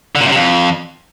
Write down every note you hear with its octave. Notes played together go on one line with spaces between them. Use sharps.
D3
A#2
F#2
C3
F2